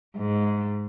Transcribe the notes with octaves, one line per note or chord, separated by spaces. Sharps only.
G#2